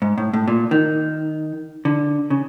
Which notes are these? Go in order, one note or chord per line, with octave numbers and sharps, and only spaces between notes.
G#2
A2
A2
A#2
D#3
D3
C#3